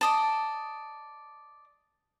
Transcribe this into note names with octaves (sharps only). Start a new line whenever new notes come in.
D5 D#5 A5